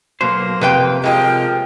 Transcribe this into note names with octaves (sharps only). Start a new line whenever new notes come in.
B1 B2 A#3 C5
F2 C3 B4 G5
F3 G#3 A#3 D#5 G5